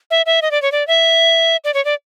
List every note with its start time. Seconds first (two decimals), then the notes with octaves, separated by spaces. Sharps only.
0.11 E5
0.26 E5
0.42 D#5
0.51 D5
0.62 C#5
0.72 D5
0.88 E5
1.64 D5
1.74 C#5
1.85 D5